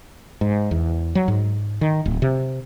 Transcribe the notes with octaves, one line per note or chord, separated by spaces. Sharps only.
G#2
E2
F#3
G#2
D#3
D1
C3